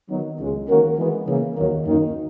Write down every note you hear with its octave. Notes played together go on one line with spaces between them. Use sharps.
D#3 F#3 B3 D#4
C#2 C#3 G#3
D#3 A#3 C#4 F#4 A#4
E3 G#3 B3
C#3 E3 A#3
D#2 D#3 F#3 A#3
F#2 D#3 A#3 D#4